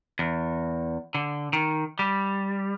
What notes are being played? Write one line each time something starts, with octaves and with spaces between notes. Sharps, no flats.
E2
D3
D#3
G3